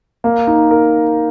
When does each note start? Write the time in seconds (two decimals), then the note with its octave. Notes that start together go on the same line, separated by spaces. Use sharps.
0.24 A#3
0.47 D#4
0.71 A#4